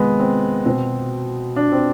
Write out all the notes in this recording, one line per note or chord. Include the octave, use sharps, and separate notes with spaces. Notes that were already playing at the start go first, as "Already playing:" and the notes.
Already playing: C3 D#3 G#3 B3
C4
B2 C4
D4
C4